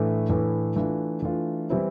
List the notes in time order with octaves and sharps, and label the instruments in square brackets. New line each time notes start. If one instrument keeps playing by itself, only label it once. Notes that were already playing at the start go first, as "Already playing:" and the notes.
Already playing: [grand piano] A2 E3 A3 D4
A2 E3 A3 D4
E3 A3 D4 F4
E3 A3 D4 F4
E3 G3 C4 E4